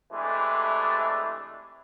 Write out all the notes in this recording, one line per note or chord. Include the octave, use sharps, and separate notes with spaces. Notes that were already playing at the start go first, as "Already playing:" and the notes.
C3 E3 G#3 A3 D4